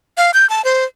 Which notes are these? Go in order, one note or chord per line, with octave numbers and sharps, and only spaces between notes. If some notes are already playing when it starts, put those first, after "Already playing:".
F5
G6
A5
C5